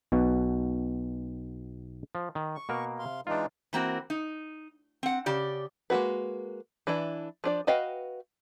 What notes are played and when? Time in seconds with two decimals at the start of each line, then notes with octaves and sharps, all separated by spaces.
0.12 B1 B2 F#4
2.15 F3
2.35 D#3
2.55 C#6
2.69 B2 A#3 A#4
2.99 C3 F5 C6
3.27 E3 G#3 D4 D#4 F4
3.73 E3 A#3 C4 F#4
4.10 D#4
5.03 C4 F#5
5.26 C#3 G4 D5
5.90 G#3 A#3 D#4 F#4 B4
6.87 E3 D4 E4
7.44 F3 D4 D5
7.67 F#4 B4 D#5 F5 G5